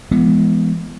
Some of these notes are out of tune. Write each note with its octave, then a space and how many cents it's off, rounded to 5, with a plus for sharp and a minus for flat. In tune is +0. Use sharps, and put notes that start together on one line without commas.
E3 +35 G#3 +0 B3 +0